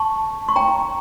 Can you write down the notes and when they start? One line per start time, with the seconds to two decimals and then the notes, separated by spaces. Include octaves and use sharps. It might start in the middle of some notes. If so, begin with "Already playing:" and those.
Already playing: A5 C#6
0.49 C#6
0.56 G5 A#5